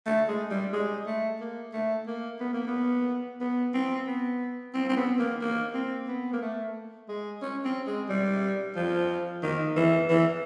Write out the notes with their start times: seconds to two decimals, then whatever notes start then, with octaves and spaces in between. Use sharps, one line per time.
0.06 A3
0.28 G#3
0.50 G3
0.73 G#3
1.06 A3
1.40 A#3
1.73 A3
2.07 A#3
2.40 B3
2.53 A#3
2.67 B3
3.41 B3
3.74 C4
4.07 B3
4.74 C4
4.89 C4
4.97 B3
5.19 A#3
5.41 A#3
5.74 C4
6.08 B3
6.33 A#3
6.42 A3
7.09 G#3
7.42 C#4
7.65 C4
7.87 G#3
8.09 G3
8.76 F3
9.43 D#3
9.76 E3
10.09 E3